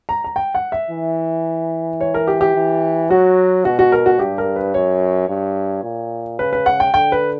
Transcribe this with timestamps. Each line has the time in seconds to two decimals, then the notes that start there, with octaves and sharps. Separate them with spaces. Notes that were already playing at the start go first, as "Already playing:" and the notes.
0.09 A#5
0.24 A#5
0.36 G5
0.55 F#5
0.72 E5
0.91 E3
2.00 C#5
2.14 A#4
2.28 G4
2.41 G4
2.55 E3
3.10 F#3 F#4
3.65 B2 F#4
3.79 F#4
3.92 A#4
4.06 F#4
4.19 G2 G4
4.38 A#4
4.56 B4
4.74 F#2 C#5
5.29 G2
5.84 A#2
6.39 C#3 B4
6.53 B4
6.66 F#5
6.80 G5
6.93 D3 G5
7.12 B4